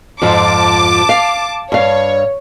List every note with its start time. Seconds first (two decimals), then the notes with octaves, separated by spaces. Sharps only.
0.22 F2 G#2 F3 A5 D6
1.09 F5
1.72 G2 C#5 F5